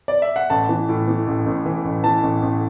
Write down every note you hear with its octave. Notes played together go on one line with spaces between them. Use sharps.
D5
E5
F#5
A1 A5
E3
A2
E3
A1
A1
E3
A1
E3 A5
A1
A1